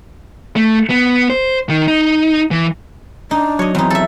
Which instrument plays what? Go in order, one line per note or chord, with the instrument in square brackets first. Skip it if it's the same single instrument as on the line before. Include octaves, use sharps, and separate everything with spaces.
[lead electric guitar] A3
B3
C5
D#3
D#4
E3
[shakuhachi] D4 [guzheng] D#4
[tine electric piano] F#3 [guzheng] C#5 D#5
[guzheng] E2 D#4 [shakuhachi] C4
[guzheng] A4 E5